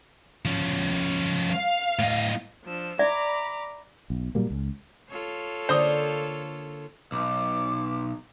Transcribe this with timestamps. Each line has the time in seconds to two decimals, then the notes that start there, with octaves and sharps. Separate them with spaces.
0.45 F3 C#4
1.52 F5
1.99 A2 D#5
2.64 F3 D4 E6
2.99 D5 E5 A#5 B5 D6
4.10 B1
4.35 A#2 F#3 G3 A#3
4.51 C#2
5.09 F4 A4 C#5
5.69 D3 A#3 C5 D#6
7.12 B1 D6